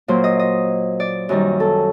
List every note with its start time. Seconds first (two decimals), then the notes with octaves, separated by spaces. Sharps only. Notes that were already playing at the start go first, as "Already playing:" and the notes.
0.08 A#2 F#3 A#3 C5
0.24 D#5
0.39 D#5
1.00 D5
1.29 F#2 D#3 G3
1.60 A4